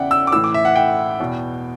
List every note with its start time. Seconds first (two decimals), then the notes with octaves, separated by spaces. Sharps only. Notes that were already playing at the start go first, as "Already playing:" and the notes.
Already playing: E2 C#3 E3 D5 E5 F#5 G5
0.11 E6
0.27 D6
0.32 A2 E3 E6
0.44 D6
0.54 E5
0.65 F#5
0.76 G5
1.20 E2 B2